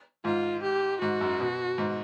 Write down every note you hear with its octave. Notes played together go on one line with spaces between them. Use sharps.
G#2 F4
G4
G#2 F#4
F#2
B2
G#2